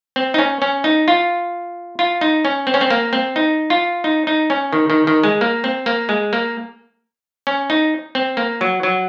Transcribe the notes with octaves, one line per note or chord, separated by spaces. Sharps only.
C4
D#4
C#4
C#4
D#4
F4
F4
D#4
C#4
C4
C#4
C4
A#3
C4
D#4
F4
D#4
D#4
C#4
D#3
D#3
D#3
G#3
A#3
C4
A#3
G#3
A#3
C#4
D#4
C4
A#3
F#3
F#3